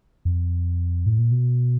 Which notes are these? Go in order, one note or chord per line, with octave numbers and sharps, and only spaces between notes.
F2
A2
A#2
B2